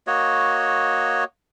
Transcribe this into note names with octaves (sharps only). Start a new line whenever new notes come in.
A#3 F#4 C#5 D#5